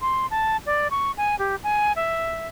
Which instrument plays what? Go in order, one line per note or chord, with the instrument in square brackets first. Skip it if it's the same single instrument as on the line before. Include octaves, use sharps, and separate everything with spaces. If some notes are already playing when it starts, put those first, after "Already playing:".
[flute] C6
A5
D5
C#6
G#5
G4
G#5
E5